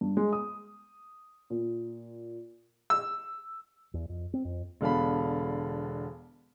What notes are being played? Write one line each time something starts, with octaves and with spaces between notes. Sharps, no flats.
G2
G#3
D#6
A#2
E6
E2
F2
C4
F2
E1 D3 B3 F5 A5 B5